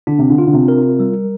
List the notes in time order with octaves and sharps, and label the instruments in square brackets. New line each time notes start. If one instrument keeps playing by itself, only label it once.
[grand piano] D3 [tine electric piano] D4
[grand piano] C3
D3
[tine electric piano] F4
[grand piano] D3
C3
[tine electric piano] A#4
G3